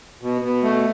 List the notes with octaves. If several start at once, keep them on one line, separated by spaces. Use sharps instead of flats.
B2
B2
A3